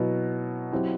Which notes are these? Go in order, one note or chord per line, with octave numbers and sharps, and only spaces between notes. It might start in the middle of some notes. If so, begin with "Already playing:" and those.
Already playing: B2 F#3 B3 E4
F#3 C4 E4 G4